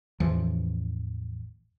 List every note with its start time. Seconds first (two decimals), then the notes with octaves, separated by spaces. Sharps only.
0.20 A1 E2 E3 F3